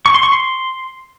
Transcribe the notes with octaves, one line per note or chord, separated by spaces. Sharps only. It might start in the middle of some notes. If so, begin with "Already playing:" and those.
C#6
C6
C#6
C6